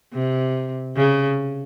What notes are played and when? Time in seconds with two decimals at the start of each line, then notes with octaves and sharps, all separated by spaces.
0.14 C3
0.97 C#3